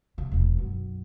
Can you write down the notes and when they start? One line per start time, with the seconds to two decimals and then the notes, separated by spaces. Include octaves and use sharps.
0.18 C#3
0.31 E1 B2
0.57 B1 F#2